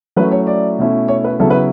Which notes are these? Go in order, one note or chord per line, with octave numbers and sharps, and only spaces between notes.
F#3 A3 C#4 E4 B4
C#5
D5
B2 A3 C#4 E4
C#5
B4
C#3 F#3 B3 E4 A4
B4